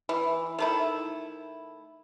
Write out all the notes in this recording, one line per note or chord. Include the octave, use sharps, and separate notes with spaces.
E3
D#3 A3 E4